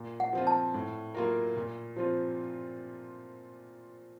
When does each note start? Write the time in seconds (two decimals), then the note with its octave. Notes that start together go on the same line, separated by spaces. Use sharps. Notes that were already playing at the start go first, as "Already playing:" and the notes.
Already playing: A#2
0.20 F#5
0.33 F3 C4 F4
0.47 A5
0.74 A2
1.14 F#3 A#3 F4 A#4
1.57 A#2
1.96 F3 C4 F4